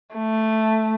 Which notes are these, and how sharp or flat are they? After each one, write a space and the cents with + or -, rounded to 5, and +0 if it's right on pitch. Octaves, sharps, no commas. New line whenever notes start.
A3 +0